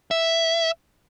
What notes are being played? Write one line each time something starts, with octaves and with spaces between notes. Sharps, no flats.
E5